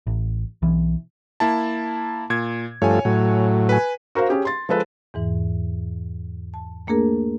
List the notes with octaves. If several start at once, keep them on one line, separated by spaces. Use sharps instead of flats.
A1
B1 E3
A#3 E4 A5
A#2 G#6
G2 F3 A3 C#5 G#5
A2 F#3
B4 G#5
F#4 A#4 C5 F5
C#4 G4 G#4
C6 A6
F3 G#3 A4 B4
E2 G#2 E3
A5
A3 A#3 D4 G#4 A#4